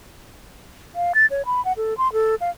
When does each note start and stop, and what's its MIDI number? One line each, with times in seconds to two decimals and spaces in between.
0.96 1.12 77
1.15 1.26 93
1.30 1.42 73
1.46 1.63 83
1.65 1.73 78
1.77 1.97 69
1.98 2.12 84
2.13 2.35 69
2.41 2.50 77